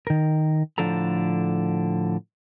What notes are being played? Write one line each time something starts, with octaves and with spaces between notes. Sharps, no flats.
D#3 A#4
A2 D3 F3 D4 A4 A#5